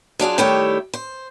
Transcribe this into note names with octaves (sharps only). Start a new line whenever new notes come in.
F#3 D4 F4 G#4
D#3 G3 A3 E4 G4 C#5
C5